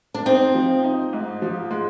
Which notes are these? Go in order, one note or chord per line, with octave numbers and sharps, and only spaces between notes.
D4
C4 D#4
F3
D#4
G#2
F3
G#3